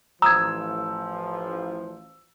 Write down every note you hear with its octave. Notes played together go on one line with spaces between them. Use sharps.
A1 F3 A#5 D#6 E6 G#6